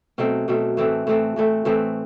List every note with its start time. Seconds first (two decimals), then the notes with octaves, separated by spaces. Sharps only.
0.18 B2 F#3 A3 C4
0.48 B2 F#3 A3 C4
0.77 A2 E3 A3 C4
1.07 A2 E3 A3 C4
1.36 A2 E3 A3 C4
1.65 A2 E3 A3 C4